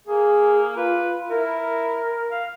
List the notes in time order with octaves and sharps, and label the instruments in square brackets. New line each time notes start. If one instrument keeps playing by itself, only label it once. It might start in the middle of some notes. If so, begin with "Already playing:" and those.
[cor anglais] A#3 [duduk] G#4
[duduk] F4 [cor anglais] B4
[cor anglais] E4 [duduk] A#4
[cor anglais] F5